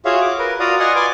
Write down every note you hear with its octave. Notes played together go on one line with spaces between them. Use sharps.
F4 F#4 G#4 C#5 E5 F5
D6
A#4 B4
F4 F#4 D5 F5 A#5 D#6
D5 D#5 F#5 G#5 C6
B4 D5 G#5 C6 D6